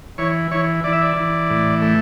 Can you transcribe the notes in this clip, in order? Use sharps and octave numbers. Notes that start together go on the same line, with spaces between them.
E3 C#5
E3 C#5
E3 D5
E5
D5
E3
A2
A3